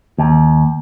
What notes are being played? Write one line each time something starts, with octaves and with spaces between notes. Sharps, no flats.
D#2